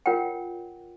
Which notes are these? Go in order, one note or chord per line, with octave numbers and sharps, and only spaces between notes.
F4 A#4 C#5 F#5 G5